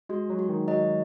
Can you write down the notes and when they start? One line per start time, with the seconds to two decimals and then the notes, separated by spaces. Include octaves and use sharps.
0.09 G#3 F#4
0.30 F#3
0.39 F#4
0.49 D#3
0.68 F#3 D#5